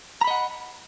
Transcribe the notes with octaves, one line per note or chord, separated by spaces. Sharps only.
D#5 F#5 A#5 B5